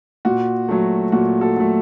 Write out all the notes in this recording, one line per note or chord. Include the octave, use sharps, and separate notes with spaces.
A#2 F#4
F#3 A3
A#2 F#4
F#4 A4
F#3 A3